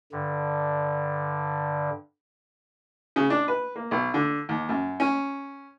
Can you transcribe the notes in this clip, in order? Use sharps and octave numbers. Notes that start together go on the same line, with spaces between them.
G2 D3
C#3
D4
B4
A#3
B1
D3
D#2
F#2
C#4